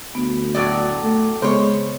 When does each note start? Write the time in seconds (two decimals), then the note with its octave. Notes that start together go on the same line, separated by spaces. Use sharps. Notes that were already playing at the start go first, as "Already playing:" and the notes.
0.15 D2 B3
0.55 A2 F#3 D5
1.03 A3
1.42 C#3 G#3 B3 C5 C#5